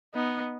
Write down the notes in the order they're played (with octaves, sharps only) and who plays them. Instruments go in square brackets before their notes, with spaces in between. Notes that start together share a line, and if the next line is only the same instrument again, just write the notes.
[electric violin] B3 [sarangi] D#4